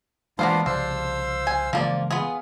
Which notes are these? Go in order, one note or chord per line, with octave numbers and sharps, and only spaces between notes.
E3 G#3 A#3 B3 D4 F4 C5 F5
C2 C#3 F3 D4 C5 F5 E6
G#5
C#3 E3 F3 G#3 A#3 D5
B3 F4 G#4